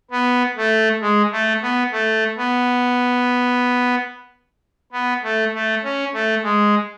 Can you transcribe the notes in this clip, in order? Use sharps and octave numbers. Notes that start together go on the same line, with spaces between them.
B3
A3
G#3
A3
B3
A3
B3
B3
A3
A3
C#4
A3
G#3